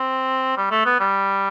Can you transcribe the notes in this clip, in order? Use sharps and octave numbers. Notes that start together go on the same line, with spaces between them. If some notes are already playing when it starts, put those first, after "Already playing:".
Already playing: C4
G3
A3
B3
G3